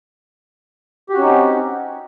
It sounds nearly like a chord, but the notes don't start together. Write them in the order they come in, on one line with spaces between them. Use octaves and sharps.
G4 F#4 C#4 D#4 C4